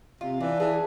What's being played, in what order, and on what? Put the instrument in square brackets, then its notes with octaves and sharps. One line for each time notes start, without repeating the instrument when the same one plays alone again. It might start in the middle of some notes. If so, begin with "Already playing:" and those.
[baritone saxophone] C3 [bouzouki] F4
[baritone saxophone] E3 [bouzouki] D4
[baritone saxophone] E3 [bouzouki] G#4